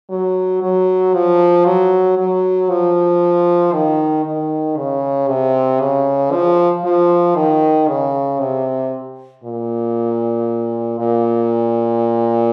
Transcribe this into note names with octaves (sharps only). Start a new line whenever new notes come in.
F#3
F#3
F3
F#3
F#3
F3
D#3
D#3
C#3
C3
C#3
F3
F3
D#3
C#3
C3
A#2
A#2